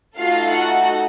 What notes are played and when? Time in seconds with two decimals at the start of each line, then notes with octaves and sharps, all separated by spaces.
0.18 A3 D#4 F4 F#4 A4 F5
0.51 F#4 F#5